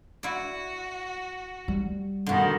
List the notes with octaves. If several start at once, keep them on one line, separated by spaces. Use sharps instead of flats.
E4 F#4 D5
G3
G2 B2 D3 D#3 F#4